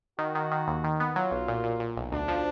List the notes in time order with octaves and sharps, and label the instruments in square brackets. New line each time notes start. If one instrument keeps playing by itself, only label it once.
[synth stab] D#3 [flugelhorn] F#4
[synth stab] D#3
D#3
D#2
D#3
B3
[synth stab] F#3 [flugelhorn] F4
[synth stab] B1
A#2
A#2
A#2
B1
[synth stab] D2 [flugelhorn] D4
[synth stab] F3